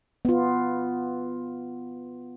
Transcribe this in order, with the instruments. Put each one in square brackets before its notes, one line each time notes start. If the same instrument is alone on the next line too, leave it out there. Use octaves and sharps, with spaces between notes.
[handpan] B3 F4